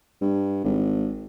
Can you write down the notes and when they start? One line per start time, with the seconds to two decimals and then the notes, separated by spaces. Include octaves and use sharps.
0.21 G2
0.64 G#1